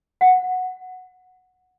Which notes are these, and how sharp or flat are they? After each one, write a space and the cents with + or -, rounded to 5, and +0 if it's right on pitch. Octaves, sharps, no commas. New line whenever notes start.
F#5 -10